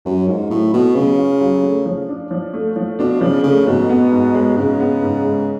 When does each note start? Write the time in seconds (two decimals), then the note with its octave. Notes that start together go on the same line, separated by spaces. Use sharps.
0.05 F#2 F#3
0.28 G#2 F4
0.50 A2 F#3
0.73 B2 A3
0.95 C#3 F#3
1.18 F4
1.40 F#3
1.63 A3
1.85 F3
2.08 D4
2.31 F3
2.53 A3
2.76 F3
2.99 B2 D4
3.21 C#3 F3
3.44 C#3 A3
3.66 G#2 B2
3.89 B3
4.12 G#2
4.34 G#3
4.56 G#2 C#3
4.80 B3
5.02 G#2
5.24 G#3